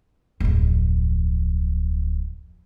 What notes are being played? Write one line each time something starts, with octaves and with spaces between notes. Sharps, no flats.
D1 F2